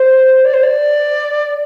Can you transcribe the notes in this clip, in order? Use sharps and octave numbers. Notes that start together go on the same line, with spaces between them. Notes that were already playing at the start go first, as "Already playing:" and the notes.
Already playing: C5
D5
C5
D5